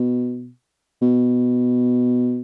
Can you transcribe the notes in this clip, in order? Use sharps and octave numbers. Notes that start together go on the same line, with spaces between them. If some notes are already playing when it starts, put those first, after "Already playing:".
Already playing: B2
B2